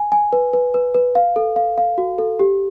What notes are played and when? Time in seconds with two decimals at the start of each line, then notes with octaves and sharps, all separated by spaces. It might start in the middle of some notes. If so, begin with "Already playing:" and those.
Already playing: G#5
0.12 G#5
0.33 B4
0.53 B4
0.74 B4
0.94 B4
1.15 F5
1.36 A4
1.56 F5
1.78 F5
1.98 F#4
2.18 A4
2.39 G4